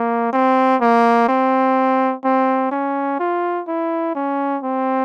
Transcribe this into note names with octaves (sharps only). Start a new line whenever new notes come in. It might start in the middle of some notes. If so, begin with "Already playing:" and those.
Already playing: A#3
C4
A#3
C4
C4
C#4
F4
E4
C#4
C4